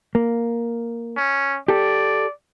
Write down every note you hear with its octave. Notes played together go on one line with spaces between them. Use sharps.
A#3
C#4
G4 A4 D5